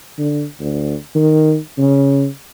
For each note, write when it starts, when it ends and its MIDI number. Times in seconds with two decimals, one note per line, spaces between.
0.18 0.45 50
0.61 0.94 38
1.16 1.57 51
1.78 2.26 49